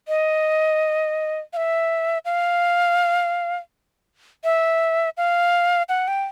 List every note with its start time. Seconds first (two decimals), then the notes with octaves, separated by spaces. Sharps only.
0.08 D#5
1.53 F5
1.57 E5
2.25 F5
4.44 E5
5.17 F5
5.89 F#5
6.08 G5